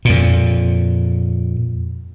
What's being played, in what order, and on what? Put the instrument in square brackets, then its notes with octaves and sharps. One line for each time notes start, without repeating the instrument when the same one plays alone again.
[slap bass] F2 A#2